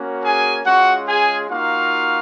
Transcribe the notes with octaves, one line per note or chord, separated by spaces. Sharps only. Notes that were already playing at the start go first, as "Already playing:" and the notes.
Already playing: A#3 C#4 F#4
G#4 G#5
G#3 C#4 F4 F#4 F#5
G#4 G#5
A#3 D#4 F4 F#4 F5